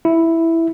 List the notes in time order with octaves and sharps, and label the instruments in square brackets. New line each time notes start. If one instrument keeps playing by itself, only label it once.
[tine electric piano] E4